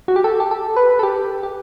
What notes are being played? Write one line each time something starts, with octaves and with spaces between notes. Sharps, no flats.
F#4
G4
A4
G4
A4
B4
A4
G4
G4